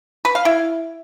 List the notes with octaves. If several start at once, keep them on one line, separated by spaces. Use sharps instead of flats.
B4
F5
E4